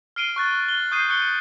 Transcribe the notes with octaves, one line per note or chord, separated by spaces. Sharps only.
F6 C7 D7 D#7 G7
C#6 F#6 A6
G7
C#6 D#6 G6 C7 D#7
C#6 F#6 C#7 G7